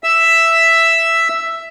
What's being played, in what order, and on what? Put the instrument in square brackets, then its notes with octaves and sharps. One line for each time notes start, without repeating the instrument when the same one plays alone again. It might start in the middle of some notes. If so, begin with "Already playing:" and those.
[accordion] E5 E6